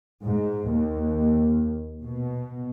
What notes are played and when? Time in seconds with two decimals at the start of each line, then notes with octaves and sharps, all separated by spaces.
0.25 G#2
0.71 D#2
2.04 B2